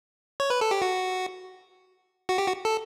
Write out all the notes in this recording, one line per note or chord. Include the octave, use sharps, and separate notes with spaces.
C#5
B4
A4
G4
F#4
F#4
G4
F#4
A4